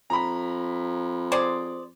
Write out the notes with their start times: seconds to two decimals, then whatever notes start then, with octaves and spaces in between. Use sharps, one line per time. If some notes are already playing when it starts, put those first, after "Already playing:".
0.10 F2 A#5 B5
1.32 G#4 C5 D5